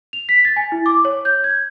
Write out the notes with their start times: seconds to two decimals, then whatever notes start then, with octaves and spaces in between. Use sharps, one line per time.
0.13 F7
0.29 B6
0.45 A6
0.56 G#5
0.72 E4
0.86 D6
1.05 C#5
1.25 G6
1.44 G#6